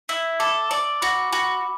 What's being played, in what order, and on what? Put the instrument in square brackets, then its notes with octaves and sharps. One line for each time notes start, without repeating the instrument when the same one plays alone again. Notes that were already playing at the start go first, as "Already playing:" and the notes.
[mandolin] E4 [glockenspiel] E6
[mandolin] A4 [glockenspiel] D6
[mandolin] D5 [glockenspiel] D6
[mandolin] F#4 [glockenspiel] B5
[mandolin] F#4 [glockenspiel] B5